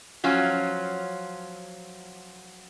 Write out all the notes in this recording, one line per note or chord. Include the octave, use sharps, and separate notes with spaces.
F3 F#3 C#4 F4